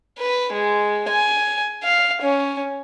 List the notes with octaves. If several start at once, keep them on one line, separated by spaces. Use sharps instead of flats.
B4
G#3
G#5
F5
C#4